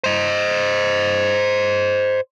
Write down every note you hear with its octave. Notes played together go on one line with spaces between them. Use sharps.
C5 D#5